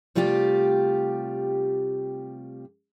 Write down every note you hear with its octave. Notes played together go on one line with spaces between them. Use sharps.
C3 G3 A3 F4 G4